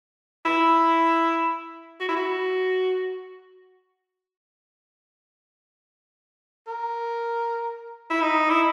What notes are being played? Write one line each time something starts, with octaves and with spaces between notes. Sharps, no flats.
E4
F#4
E4
F#4
A#4
E4
D#4
E4